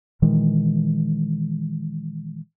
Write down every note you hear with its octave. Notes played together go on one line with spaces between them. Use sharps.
A#2 D#3 E3 G#3